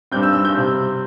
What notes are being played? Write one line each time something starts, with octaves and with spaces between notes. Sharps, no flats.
G2 G3 C4 G6
E6
E6
G6
C3 G3 C4